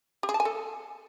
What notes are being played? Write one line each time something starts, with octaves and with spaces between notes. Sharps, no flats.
G4
G#4
A5
G#5
A4